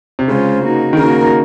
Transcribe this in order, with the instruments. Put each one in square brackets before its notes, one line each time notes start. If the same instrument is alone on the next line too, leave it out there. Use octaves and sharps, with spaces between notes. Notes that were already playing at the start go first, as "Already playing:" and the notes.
[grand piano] C3
[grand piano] C#3 [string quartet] G#3 C#4 F4 C5
[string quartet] A#3 D#4 F#4
[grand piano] D#3
[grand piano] C#3 [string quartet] A#3 D#4 F#4 A#4